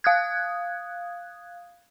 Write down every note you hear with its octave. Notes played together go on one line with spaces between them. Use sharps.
F5 D#6 F#6 G#6